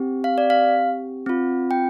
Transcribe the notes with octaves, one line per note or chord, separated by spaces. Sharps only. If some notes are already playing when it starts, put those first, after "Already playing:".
Already playing: C4 G4
F5
D5
F5
C4 F4
G5